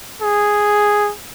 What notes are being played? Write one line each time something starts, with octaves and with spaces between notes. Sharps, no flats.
G#4